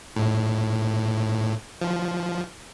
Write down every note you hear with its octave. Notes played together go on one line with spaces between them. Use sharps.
A2
F3